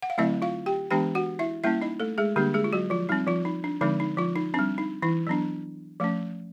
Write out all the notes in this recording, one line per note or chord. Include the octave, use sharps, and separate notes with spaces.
F#5
F5
D3 F#3 A3 C4 E4 E5
F4 F5
G4 G5
E3 G#3 B3 D4 G4 G5
F#4 F#5
E4 E5
G3 A#3 C#4 E4 E5
D#4 D#5
A3 A4
G#3 G#4
D3 G3 A#3 D4 G4
G#3 G#4
F4
F#3 F#4
F3 F4
G3 C4 D#4
F3 F4
D#4
D4
D3 F3 G#3 C4 D#4
D#4
F3 F4
D#4
G3 C4 D4
D#4
E3 E4
F#3 B3 D4
F3 A3 C#4